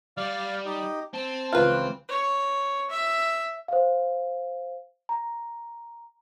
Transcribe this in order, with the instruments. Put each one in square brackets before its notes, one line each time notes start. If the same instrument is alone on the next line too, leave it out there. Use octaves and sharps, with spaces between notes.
[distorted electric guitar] G3 [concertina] D5 F5 F6
[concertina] D#4 G4 D#5
[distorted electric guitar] C4 [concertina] A5
[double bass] C#2 E3 [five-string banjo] F4 B4 [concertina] F#6
[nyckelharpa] C#5
E5
[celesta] C5 F5
A#5